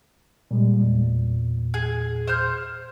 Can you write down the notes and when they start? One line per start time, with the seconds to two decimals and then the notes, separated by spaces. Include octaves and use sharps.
0.51 A#2 G3 G#3
0.83 E2 A#2
1.74 G#4
2.27 C5 F6 G6